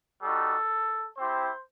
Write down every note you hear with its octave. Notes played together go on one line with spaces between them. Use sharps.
G3 D#4 F#4 A4
C4 E4 G4 C5